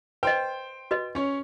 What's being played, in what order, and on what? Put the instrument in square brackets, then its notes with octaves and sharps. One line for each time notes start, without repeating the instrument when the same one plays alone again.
[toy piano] B4 D#5 [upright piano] C5 G5
[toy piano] F#4 B4 D#5
[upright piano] C#4 C#5